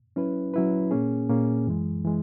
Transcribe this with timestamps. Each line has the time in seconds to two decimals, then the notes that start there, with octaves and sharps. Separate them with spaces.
0.16 F#3 C#4 E4 B4
0.54 F#3 C#4 E4 B4
0.91 A#2 A#3 C#4 G#4
1.29 A#2 A#3 C#4 G#4
1.67 F#2 E3 G#3
2.05 E3 G#3